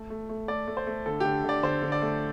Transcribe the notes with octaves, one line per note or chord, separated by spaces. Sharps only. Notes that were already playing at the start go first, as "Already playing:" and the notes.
Already playing: A3
A3
A3
A3 D5
A3
C5
A3
D3 A4
G4
D3
D3 D5
D3 C5
D3
D5
A3